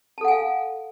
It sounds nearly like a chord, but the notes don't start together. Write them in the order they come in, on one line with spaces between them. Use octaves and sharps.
A5 A4 F#5 G#5 F5